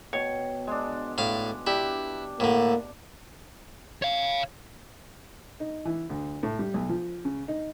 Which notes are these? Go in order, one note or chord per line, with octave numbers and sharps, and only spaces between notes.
B2 C#5 G5
G#3 D4
A2 F5
D4 E4 G4
A2 D3 A#3
C#5 F5
D#4
E3
D2
A2
G3
B1
F3
C#3
D#4